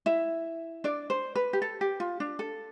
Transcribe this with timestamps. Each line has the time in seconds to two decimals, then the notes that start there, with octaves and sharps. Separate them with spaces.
0.06 E4 E5
0.84 D4 D5
1.10 C5
1.36 B4
1.53 G4
1.62 A4
1.81 G4
2.00 F4
2.20 D4
2.39 A4